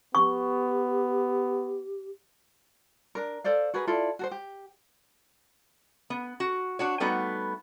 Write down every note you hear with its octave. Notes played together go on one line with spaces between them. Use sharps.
B3 G4 C#6
D4 A#4
A4 C5 D5 F5
F#4 G#4 A#4 B4
E4 F4 A4 D5
F#4 A4 C5
G4
B3
F#4
D4 F#4 C#5
G3 A3 B3 D#4 F#4